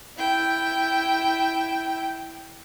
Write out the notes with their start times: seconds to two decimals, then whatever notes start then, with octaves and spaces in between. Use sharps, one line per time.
0.18 E4 G5